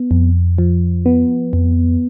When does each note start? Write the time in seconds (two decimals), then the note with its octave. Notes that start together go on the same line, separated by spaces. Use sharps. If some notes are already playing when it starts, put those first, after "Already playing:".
Already playing: B3
0.11 F2
0.58 F3
1.06 B3
1.53 F2